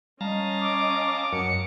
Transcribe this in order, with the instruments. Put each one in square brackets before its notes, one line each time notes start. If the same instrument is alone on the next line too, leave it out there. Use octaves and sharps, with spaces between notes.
[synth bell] G3 [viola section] C#4 D#5 [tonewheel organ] F5 A5 A#5
[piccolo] D6
[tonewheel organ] F#2 F#3 [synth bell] A#4 [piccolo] C#7